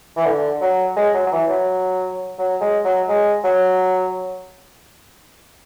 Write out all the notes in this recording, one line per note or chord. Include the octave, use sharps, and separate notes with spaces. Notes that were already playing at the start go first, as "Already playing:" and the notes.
E3
D3
F#3
G#3
F#3
F#3
E3
F#3
F#3
G#3
F#3
G#3
F#3